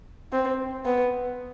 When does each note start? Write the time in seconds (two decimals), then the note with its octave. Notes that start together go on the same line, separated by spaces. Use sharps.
0.33 C4
0.85 B3